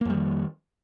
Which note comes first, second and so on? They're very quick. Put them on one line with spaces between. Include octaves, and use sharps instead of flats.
A#3 F2 G3 D#3